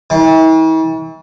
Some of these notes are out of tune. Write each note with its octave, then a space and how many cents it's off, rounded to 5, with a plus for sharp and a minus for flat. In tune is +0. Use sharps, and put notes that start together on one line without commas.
E3 -45